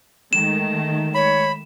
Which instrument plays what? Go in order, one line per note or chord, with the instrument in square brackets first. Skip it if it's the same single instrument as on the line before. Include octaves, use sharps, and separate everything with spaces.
[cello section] D#3 G#3 A3 [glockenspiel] E7
[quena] C#5 [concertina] B5